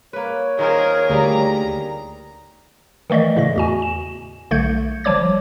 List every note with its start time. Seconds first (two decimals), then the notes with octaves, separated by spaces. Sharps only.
0.13 A#3 B4 C#5
0.59 D#3 F4 G#4 A#4 C5
1.10 D2 G3 A#3 G#4 A#5
3.10 D#3 E3 A3 D5 D#5
3.36 A2 C#3 A3 A#6
3.56 E2 F#4 G#5
3.82 E7
4.51 B1 D3 A3 G6 G#6 C#7
5.04 G1 F3 G3 C#5 D6 G#6